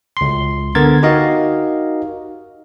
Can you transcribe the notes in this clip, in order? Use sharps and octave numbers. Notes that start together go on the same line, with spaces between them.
C#2 C6
D3 B3 A#4 G#6 A6
D#4 F#4 G4 A#4 D#5 F5